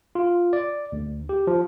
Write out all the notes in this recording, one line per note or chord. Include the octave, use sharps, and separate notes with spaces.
F4
D5
D2
G4
F3